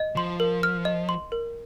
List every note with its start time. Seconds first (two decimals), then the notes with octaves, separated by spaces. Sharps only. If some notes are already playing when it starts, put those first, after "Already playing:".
Already playing: D#5
0.16 F3 C6
0.40 A#4
0.63 F6
0.85 D#5
1.09 C6
1.32 A#4